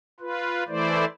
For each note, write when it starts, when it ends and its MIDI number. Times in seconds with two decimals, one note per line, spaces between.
0.20 0.64 65
0.20 0.64 71
0.68 1.05 52
0.68 1.05 57
0.68 1.05 64
0.68 1.05 72
0.68 1.05 74